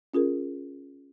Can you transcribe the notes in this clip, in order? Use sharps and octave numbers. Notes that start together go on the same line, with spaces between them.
C#4 F4 G#4 A#4